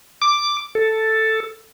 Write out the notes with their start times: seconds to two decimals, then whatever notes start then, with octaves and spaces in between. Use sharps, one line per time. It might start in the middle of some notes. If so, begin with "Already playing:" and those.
0.22 D6
0.75 A4